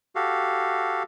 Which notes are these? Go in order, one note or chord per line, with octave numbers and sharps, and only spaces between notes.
F#4 G4 A4 F5